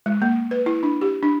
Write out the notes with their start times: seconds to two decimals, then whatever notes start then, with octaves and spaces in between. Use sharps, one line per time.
0.06 G#3
0.22 A#3
0.51 B4
0.66 E4
0.83 D4
1.01 G4
1.23 D4